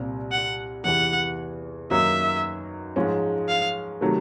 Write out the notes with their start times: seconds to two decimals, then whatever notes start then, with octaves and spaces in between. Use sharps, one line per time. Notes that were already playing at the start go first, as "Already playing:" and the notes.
Already playing: C2 A#2 G3 C4
0.32 F#5
0.85 E2 C3 E3 F#5
1.91 F#2 D#3 F#3 A#3 D#4 E5
2.96 G#2 F3 G#3 C#4
3.49 F5
4.01 C3 D#3 F#3 A3